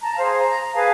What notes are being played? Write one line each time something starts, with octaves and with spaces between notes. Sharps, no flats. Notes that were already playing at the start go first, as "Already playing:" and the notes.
A5 A#5
G#4 C5 F5
A#5
G#4 B4 F5 A5